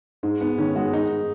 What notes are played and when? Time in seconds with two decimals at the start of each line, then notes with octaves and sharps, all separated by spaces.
0.23 G#2 G#3
0.41 G#2 B3
0.58 D#3 C#4
0.75 G#3 F#4
0.93 G#2 D#4